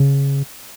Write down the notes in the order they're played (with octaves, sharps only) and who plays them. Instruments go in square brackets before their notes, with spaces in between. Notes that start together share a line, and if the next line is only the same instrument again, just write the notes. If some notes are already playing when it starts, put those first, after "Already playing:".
Already playing: [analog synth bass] C#3